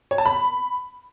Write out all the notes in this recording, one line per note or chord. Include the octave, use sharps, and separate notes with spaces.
C#5
A5
B5